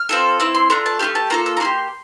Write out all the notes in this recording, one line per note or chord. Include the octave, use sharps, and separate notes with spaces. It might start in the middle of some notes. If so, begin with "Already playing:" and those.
Already playing: F6
C4 F4 A4
C4 E4 E6
C6
A3 D4 F4 A#5
A5
A3 E4 G4 F5
A5
A#3 F4 A4 A#5
E6
A#5
A#3 E4 G4 C6